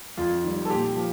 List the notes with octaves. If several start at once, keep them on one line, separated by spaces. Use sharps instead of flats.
F2 F4
D#3 G3
A4
A#2 G4
F3